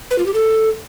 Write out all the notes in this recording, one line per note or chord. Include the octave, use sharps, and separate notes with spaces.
B4
F4
G4
A4